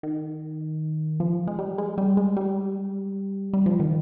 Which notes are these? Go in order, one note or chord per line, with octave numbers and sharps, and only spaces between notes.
D#3
F3
G#3
G3
G#3
G3
G#3
G3
G3
F3
D#3